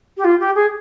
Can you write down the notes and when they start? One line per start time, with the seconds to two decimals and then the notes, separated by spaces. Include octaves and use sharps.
0.17 G4
0.24 F4
0.39 G4
0.55 G#4